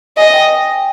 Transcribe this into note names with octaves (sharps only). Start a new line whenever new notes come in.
D#5 G#5
G5